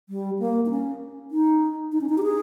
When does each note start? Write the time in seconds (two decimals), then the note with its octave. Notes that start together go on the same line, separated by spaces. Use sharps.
0.09 G3
0.39 A#3
0.66 D#4
0.70 C#4
1.31 D#4
1.92 D#4
2.01 C#4
2.09 D#4
2.18 G4
2.23 G#4